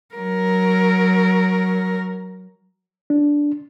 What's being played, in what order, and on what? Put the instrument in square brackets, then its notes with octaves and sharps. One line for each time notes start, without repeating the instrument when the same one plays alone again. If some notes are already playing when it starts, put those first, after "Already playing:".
[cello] F#3 A#4
[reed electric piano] D4